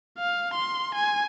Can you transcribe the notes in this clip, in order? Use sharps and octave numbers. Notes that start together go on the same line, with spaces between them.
F5
C6
G#5